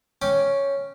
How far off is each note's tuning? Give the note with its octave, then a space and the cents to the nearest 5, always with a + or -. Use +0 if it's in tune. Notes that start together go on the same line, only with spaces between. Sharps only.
C#4 +0 G5 +0 D6 +0